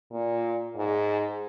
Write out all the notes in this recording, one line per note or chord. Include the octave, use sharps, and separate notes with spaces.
A#2
G#2